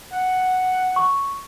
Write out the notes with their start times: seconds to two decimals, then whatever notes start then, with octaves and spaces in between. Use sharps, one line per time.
0.13 F#5
0.96 C#6